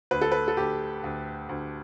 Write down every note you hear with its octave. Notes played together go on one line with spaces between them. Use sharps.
D2 B4
A4
B4
A4
D2 G4
D2
D2